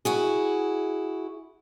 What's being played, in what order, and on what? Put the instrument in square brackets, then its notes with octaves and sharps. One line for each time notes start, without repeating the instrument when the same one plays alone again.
[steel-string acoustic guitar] E4 F#4 G#4